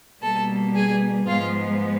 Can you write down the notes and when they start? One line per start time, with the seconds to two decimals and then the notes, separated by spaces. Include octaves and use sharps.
0.21 B2 G3 A#3 A4 A5
0.75 G#4 G#5
1.27 G#2 F3 G#3 B3 F4 F5